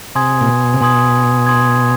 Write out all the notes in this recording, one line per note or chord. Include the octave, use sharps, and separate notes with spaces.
C3 G#5 C6 D#6 G#6
A#2
B2
C3
B2 G#5 C6 D#6 G#6
G#5 C6 D#6 G#6